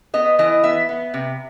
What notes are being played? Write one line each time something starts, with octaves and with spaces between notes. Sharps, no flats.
B3 D#5
E3 D#5
B3 E5
B3
C3